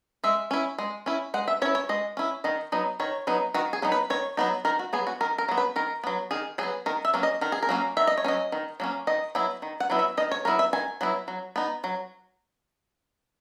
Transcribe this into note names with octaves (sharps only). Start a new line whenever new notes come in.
G#3 E5
C#4 E4
G#3
C#4 E4
G#3 F#5
E5
C#4 E4 C#5
C#5
G#3 D#5
C#4 E4
D#3 D#5
F#3 B3 D#4
D#3 C#5
F#3 B3 D#4
D#3 F#4
G#4
F#3 B3 D#4
B4
D#3 C#5
F#3 B3 D#4
D#3 A#4
F#4
F#3 B3 G#4
F#4
D#3 A#4
A#4
F#3 B3
B4
D#3 A#4
F#3 B3
D#3 G#4
F#3 B3 G#4
D#3 A#4
E5
F#3 A#3 C#4
D#5
D#3 A#4
G#4
A#4
F#3 A#3 C#4
D#3 E5
D#5
C#5
F#3 A#3 C#4 D#5
D#3
F#3 A#3 C#4
D#3 D#5
F#3 B3 E4
D#3
F#5
F#3 B3 E4
E5
D#3 D#5
C#5
F#3 B3 E4 A#4
E5
D#3 G#5
F#3 B3 E4
F#3
B3 D#4
F#3